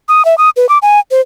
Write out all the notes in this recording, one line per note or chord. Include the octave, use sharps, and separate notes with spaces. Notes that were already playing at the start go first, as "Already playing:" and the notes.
D#6
E5
D#6
B4
D6
G#5
C5